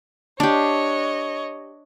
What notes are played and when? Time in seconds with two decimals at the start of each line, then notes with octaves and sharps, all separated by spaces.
0.40 D4 G4 C#5 D#5